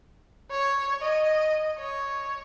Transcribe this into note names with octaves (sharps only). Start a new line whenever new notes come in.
C#5
D#5
C#5